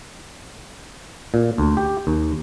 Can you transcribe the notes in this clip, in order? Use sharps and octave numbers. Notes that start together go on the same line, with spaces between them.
A#2
D2
G4
D#2